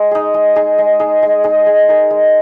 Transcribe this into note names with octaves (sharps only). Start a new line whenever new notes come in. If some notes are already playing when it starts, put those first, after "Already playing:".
Already playing: G#3
D#4 G#4
G#3
D#4 G#4
G#3
D#4 G#4
G#3
D#4 G#4
G#3
D#4 A#4
G#3